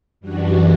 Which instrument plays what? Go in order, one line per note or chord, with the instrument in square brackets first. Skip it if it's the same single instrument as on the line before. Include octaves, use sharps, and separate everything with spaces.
[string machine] F#2 E3 G3 D4 F#4